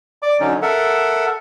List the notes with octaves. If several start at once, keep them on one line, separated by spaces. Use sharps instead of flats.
D5 D6
D3 F#3 C#4 D#4
A4 A#4 E5 F#5